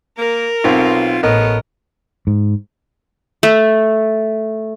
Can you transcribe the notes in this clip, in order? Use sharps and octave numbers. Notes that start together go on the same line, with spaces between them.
A#3 A#4
B1 C4 F4
A1 B3 A4 A#4 C#5 D#5
G#2
A3